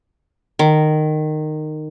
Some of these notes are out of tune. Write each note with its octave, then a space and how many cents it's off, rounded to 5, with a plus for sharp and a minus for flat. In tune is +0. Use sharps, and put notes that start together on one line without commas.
D#3 -15